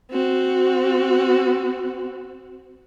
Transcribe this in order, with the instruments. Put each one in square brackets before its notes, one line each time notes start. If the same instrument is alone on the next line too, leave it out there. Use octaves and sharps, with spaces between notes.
[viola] C4 F#4